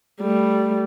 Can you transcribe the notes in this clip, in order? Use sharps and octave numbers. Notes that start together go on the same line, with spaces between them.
G3 A3